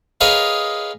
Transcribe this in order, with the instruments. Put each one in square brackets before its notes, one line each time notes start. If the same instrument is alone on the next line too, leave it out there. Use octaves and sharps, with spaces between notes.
[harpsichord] G#4 A#4 B4 C#5 D#5 F5